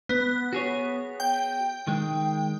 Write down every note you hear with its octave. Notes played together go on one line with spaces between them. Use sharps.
B3
F#4 G#4 C#5
G5
D#3 G#3